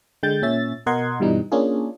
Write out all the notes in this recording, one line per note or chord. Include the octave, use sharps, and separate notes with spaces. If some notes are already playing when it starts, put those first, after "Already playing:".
D3 G#3 G5 G6 A6
A#2 C#4 E5 A6
B2 A#4 D#5 F#5 C6 G#6
G2 B2 E3 G3 D#4
A#3 C#4 D4 F4 G#4